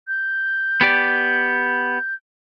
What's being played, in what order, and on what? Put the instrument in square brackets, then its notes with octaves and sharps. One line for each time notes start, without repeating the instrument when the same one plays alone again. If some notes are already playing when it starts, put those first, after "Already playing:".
[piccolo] G6
[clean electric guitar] B3 G4 D5